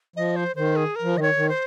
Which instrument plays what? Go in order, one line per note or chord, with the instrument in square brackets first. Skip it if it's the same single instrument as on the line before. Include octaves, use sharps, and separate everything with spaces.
[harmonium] F3 [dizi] D#5
[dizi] C5
[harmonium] D#3 [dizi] C5
[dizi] G#4
A#4
[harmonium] F3
[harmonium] D#3 [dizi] D#5
[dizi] C#5
[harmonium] D#3
[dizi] C5